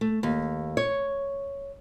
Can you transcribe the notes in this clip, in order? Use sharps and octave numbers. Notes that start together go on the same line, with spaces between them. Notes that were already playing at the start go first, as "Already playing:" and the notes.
A3
D#2
C#5